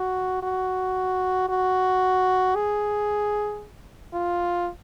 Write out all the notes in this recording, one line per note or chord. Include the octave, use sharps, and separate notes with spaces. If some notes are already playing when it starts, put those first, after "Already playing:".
Already playing: F#4
F#4
F#4
G#4
F4